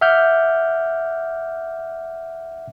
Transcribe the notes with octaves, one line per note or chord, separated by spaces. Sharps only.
E5 F#5 D6 F6 G6